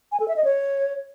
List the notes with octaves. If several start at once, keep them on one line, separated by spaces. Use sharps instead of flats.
G#5
A4
E5
D#5
C#5